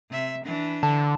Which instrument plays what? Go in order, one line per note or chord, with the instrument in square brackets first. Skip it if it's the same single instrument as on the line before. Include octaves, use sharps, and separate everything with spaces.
[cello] C3 E5
E3 D4
[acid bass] D3 [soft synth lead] A5